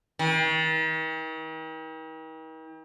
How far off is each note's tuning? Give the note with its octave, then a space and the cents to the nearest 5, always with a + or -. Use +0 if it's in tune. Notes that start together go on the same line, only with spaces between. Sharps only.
D#3 +45